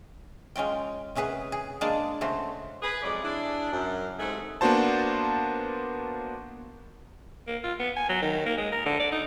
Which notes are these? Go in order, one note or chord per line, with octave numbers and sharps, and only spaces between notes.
G#3 C#4 F4 G5
C3 C#4 G#4 B4 F#5
G#4
G#3 A#3 D4 G#4 D5 A5
C#3 A3 F#4 C5
G#4 B4
F2 F#3 G#3 C#4 D5
D4 E4 G#4
F#2
G#2 C3 A3 G#4 D#5 F#5
A#3 B3 D4 F#4 C5 A5
A#3
F4
B3
G#5
F#3
D#3
A#3
G#3
A#4
D3
D5
D#4